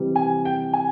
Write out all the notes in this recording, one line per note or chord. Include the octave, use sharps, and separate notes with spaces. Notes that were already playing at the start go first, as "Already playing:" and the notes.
Already playing: C3 E3 G3
G#5
G5
G#5